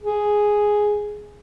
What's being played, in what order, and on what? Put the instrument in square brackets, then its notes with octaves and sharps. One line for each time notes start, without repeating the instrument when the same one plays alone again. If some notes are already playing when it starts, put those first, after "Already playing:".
[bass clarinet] G#4